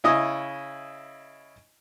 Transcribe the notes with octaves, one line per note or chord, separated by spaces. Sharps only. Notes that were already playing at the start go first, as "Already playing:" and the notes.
C#3 E4 D#5 G#5 D#6